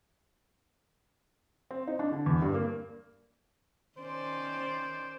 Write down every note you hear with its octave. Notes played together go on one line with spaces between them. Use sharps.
C4
D#4
D4
D3
E2
G2
A#3
D#3 C#4 C5 D5